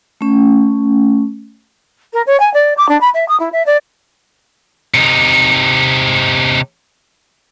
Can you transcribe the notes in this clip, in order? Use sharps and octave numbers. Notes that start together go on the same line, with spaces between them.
A3 C#4
A#4
C#5
G#5
D5
D6
D4
B5
E5
D#6
E4
E5
D5
C3 D#4